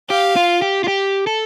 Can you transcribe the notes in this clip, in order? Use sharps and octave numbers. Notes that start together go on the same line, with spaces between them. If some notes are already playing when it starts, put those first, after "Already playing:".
G4 F5
F4
G4
F4
G4
A4